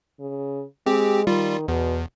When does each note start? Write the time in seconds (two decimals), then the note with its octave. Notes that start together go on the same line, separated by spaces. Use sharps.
0.20 C#3
0.86 G#3 C4 G4
1.27 D#3 G3 F4
1.68 E2 B2